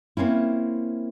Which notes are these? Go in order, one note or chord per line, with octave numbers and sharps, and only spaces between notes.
A#3 C4 C#4 E4